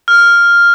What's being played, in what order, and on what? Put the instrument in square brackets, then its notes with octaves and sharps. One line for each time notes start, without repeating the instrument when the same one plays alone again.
[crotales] F6